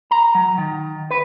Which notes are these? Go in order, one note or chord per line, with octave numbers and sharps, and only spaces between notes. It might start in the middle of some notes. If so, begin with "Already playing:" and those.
A#5
F#3
D#3
B4